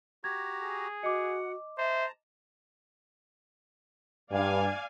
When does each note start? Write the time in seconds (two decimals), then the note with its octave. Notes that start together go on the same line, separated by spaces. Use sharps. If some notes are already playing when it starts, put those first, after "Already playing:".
0.24 F#4 G4 A#5 G#6
0.61 G#4
1.03 F#4 D#5 F#5 D6
1.78 C5 E5 A5 A#5
4.31 G2 D5 F5 G#5